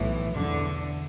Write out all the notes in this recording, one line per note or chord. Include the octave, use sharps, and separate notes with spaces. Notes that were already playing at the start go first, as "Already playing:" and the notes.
Already playing: B1 A2 E3
E2 D3